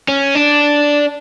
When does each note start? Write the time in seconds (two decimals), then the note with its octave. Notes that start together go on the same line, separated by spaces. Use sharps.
0.08 C#4
0.35 D4